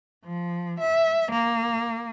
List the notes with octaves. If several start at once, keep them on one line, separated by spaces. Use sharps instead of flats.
F3
E5
A#3